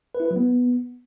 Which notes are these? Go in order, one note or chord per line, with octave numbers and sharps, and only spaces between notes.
B4
E4
B4
F#3
B3